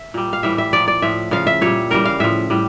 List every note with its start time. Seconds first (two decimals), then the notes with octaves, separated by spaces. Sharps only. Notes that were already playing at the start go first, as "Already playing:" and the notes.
Already playing: E5
0.14 A#2 G3
0.33 F5
0.43 A2 E3 G3 E5
0.58 E5
0.73 A#2 F3 D5
0.88 D5
1.02 A2 F3 E5
1.31 C#3 F3 F5
1.47 E5
1.61 A#2 G3 C#5
1.91 C#3 E3 G3 A#4
2.05 F5
2.20 A2 F3 E5
2.50 A2 G3